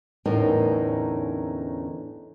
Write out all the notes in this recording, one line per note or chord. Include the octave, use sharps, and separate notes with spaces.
E2 A2 D3 C#4 D#4 A#4